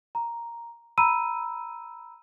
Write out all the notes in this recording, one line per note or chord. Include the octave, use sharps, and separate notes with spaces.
A#5
A#5 B5 E6 D#7